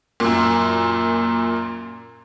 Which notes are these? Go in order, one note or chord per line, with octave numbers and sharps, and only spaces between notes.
F#2 A#2